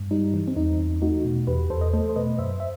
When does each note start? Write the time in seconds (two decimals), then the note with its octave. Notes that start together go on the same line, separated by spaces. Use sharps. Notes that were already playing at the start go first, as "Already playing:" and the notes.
Already playing: G2
0.11 G3 D#4
0.34 E3
0.48 C4
0.56 E2 D#4
0.80 E2
1.02 A3 D#4 F#4
1.25 B2
1.47 E2 G4 B4
1.70 E2 A4 C5
1.81 D#5
1.93 A3 A4 C5
2.09 C5
2.16 B2 B4 D#5
2.39 F#2 C5 E5
2.60 E5